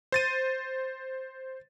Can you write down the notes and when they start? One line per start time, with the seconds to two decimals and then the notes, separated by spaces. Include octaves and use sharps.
0.12 C5 A6 D#7